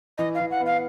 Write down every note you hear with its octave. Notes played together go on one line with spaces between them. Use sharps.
E3 D#5
F5
E3
F#5
B3
F5